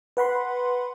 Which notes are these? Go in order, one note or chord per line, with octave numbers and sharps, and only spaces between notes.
B4 F#5 B5 C6